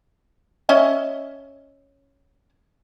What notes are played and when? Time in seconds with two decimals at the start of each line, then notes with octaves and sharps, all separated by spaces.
0.69 C#4 D#5 E5